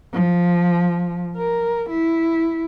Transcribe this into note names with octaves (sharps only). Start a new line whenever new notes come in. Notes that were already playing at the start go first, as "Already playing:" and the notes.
F3
A#4
E4